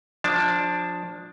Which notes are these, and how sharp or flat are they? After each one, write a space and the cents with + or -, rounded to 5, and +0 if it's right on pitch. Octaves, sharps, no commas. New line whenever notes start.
F3 +20 D4 +0 A5 +0